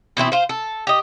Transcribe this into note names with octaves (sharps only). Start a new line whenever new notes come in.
B2 E3 C4 E4
F4 C5
A4
G4 D#5